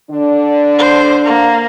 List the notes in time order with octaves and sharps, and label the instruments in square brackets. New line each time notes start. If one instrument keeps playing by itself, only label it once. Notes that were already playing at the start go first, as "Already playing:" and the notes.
[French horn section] D3 D4
[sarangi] C5
A#3